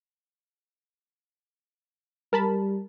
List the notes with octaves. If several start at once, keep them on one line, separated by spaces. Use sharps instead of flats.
G3 A#4 A5 B5